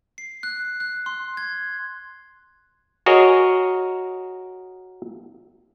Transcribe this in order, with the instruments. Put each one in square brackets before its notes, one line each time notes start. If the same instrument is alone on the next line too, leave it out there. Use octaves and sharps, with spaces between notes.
[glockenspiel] C7
F#6
F#6
C6
G#6
[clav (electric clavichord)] F#4 G#4 A#4 C#5 D#5